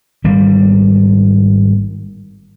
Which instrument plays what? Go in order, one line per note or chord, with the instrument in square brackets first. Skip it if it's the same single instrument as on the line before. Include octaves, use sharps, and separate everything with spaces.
[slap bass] G#1 G3 A#3